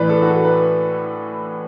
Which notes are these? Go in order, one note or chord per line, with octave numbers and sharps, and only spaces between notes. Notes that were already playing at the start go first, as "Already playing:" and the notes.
Already playing: A2 E3 B4 D5
A4
F#4
A4
B4